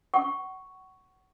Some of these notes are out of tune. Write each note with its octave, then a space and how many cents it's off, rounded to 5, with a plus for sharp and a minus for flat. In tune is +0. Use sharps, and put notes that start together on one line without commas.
F#5 +25 C#6 +0